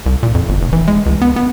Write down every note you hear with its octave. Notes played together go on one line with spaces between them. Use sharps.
C2
A#2
F2
G1
F1
E3
G#3
C#2
B3
B3